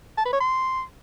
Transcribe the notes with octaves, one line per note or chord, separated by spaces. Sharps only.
A5
B4
C#5
C6